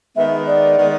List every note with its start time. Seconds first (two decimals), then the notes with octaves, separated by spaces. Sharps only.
0.16 D#3 G#3 B3 E5
0.47 D5
0.78 D#3 G#3 B3